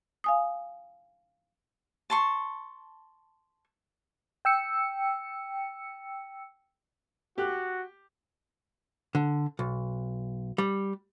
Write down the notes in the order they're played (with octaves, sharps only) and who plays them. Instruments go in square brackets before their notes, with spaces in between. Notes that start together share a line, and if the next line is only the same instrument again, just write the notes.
[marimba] F5 G#5 D#6
[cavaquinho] A5 C6 C#6
[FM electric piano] G5 E6 C#7
[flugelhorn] F#4 [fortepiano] G4 F#6
[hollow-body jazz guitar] D3
B1
G3